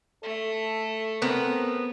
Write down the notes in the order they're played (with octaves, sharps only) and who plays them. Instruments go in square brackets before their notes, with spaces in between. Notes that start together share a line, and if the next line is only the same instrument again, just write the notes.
[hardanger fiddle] A3 [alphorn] A4
[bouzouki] B3 B4 [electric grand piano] C4 A#4